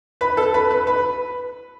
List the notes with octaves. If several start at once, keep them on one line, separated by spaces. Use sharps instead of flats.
B4
A4
B4
B4
B4